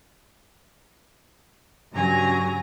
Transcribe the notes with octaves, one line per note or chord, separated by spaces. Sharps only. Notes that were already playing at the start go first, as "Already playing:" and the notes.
G2 C#3 F#3 G#5 A#5 A#6